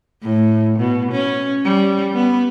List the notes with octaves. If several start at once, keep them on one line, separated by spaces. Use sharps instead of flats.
A2
B2
C#4
G3
B3